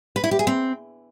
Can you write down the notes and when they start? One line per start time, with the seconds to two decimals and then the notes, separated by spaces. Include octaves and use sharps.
0.16 B4
0.24 E4
0.31 G4
0.39 G#4
0.47 C4